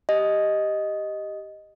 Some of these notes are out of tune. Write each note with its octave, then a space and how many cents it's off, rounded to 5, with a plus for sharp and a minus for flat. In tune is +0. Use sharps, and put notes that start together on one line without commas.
G4 +0 D#5 +0